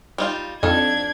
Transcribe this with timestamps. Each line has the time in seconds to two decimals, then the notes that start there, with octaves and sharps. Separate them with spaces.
0.18 G3 D#4 F4
0.63 F2 D4 D#4 A4 F5 G#6